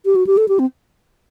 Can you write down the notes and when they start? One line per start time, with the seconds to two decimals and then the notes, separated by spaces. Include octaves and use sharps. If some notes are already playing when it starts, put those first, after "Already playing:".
0.05 G4
0.16 F#4
0.27 G4
0.37 A4
0.48 G4
0.59 C4